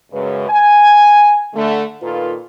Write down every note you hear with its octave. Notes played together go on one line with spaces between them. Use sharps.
F#2 C#3 G#3 B4
G#5
D3 A3
A#2 D#3 F4 A4 B4